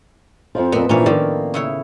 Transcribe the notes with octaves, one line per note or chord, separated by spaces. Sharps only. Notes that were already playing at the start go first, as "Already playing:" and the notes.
F2 G#2 F3
F2 A#2 B3 C4
A#2 E3 F3 C#4 D4 C#5
A2 D#3 F3 A#3 D5
C#3 E4 C#5